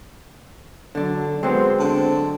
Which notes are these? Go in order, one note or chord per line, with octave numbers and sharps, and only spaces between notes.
D3 F#3 D4
F#3 G#3 B3 C4
D3 C4 A5